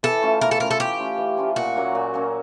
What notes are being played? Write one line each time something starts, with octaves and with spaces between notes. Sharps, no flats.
E3 A4
A3 C#4 F4
E3 A#4
A4
A3 C#4 F4 A#4
A4
E3 G4
A3 C#4 F4
E3
A3 C#4 F4
A#2 F#4
F#3 A#3 C#4
A#2
F#3 A#3 C#4